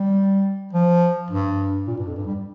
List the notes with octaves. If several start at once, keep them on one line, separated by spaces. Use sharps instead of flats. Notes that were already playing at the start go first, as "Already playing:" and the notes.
Already playing: G3
F3
G2
A#2
G2
F2
G2
G3